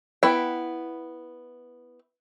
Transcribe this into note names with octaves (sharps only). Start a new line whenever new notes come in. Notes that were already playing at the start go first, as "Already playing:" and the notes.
B3 E4 G5